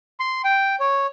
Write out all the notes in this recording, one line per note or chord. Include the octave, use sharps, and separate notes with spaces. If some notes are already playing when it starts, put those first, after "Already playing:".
C6
G5
C#5